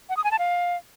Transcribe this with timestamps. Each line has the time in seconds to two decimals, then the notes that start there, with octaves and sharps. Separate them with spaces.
0.09 F#5
0.17 D#6
0.24 G#5
0.31 A5
0.39 F5